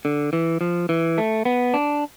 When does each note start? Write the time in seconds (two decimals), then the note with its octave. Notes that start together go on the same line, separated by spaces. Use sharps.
0.05 D3
0.33 E3
0.61 F3
0.89 E3
1.18 A3
1.45 B3
1.74 D4